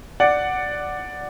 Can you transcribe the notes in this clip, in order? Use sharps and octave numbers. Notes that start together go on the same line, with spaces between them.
D5 F#5